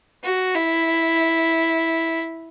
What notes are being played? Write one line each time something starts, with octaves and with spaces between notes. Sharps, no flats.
F#4
E4